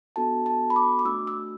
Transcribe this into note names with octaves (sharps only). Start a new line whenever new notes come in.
B3 D4 F#4 A4 A5
A5
B5
D6
D6
A3 D4 F#4 E6
E6